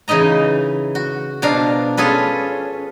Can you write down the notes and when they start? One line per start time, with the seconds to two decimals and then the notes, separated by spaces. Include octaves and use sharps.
0.08 C#3 E3 D#4 D#5 A#5
0.95 F#4
1.42 B2 F3 D4 F5 A#5
1.97 C#4 F4 G#4 A4 B4